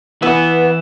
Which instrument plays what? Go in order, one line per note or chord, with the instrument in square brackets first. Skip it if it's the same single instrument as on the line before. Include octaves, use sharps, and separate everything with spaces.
[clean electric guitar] E3 E4 [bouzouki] B3